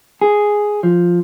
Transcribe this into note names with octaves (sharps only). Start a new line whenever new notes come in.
G#4
F3